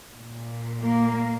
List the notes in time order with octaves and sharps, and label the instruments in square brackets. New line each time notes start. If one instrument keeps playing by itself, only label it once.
[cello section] A#2
A#3